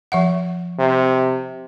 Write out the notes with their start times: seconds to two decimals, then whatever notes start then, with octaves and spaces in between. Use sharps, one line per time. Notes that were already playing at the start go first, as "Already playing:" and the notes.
0.12 F3 E5 F#5
0.79 C3